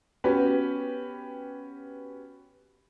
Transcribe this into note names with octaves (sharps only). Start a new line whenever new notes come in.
B3 C#4 F#4 G4 B4